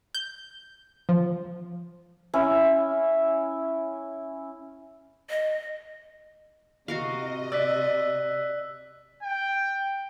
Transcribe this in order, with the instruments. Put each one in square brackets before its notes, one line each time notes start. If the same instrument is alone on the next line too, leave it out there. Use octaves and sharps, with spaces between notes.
[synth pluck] G6
F3
[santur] C#4 E4
[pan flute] D#5
[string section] C3 D#5 [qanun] F#4 A#4 F5
[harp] D5 [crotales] E6 F#6 B6
[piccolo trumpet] G5